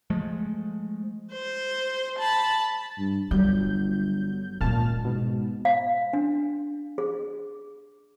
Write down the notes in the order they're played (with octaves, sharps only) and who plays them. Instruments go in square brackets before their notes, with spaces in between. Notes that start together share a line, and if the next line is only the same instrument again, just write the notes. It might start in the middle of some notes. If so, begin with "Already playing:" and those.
[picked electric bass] F3 G#3 A3
[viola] C5
A5 B5
[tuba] G2
[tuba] G1 [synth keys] F#3 G6 [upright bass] G3
[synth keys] A#2 A5 F6 [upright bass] G#3 C#4
[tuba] G#2 [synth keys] B2
[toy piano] F5
D4
G#4